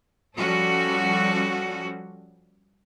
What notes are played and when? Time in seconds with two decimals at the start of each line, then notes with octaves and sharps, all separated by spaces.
0.38 F3 G3 C#4 F#4 A4